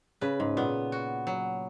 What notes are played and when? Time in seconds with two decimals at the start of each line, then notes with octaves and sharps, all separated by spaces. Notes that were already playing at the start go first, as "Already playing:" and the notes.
0.21 C#3 B4
0.40 G#2
0.57 A#2 B3
0.92 F#4
1.27 F#3